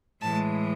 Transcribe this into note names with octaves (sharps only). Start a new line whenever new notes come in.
A2 E3 G#3 A5